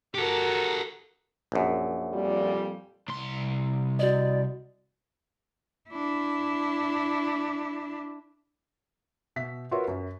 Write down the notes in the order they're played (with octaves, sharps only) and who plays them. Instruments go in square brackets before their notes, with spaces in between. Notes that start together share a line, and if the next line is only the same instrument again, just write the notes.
[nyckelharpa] F#4 A#4 [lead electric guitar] G4 A4
[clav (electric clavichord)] A#1 F#2
[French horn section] F2 A#2 G3
[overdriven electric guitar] C2 C6
[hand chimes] F#4 D#5 [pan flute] D5
[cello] D4 E4
[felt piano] B2 E5 B6
F4 F#4 A#4 B4 C#5 E5
F#2